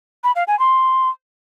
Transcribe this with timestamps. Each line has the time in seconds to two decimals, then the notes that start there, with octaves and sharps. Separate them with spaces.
0.24 B5
0.36 F5
0.48 G#5
0.59 C6